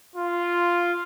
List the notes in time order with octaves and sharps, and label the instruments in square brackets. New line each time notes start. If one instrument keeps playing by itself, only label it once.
[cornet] F4